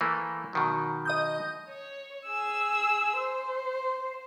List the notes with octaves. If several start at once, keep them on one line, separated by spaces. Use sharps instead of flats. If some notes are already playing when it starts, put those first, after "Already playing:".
E3 A3 A#3
B2 D#3 F#3
D#5 D#6 G6
C#5
G#4 E6
C5